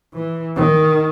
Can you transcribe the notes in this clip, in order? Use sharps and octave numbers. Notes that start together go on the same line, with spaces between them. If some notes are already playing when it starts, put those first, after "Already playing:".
E3
D#3